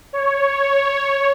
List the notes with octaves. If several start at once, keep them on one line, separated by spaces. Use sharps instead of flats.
C#5